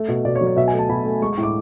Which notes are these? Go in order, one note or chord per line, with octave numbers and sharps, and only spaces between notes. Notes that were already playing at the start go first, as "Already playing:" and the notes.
Already playing: A3
B2
B2 D5
C#5
F#3
C#5
B2 E5
G#5
A3
A5
B2 B5
A3
G#3 C#6
C#6
A2
D6